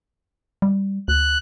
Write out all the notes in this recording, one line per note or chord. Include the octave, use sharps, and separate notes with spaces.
G3
D2 F#6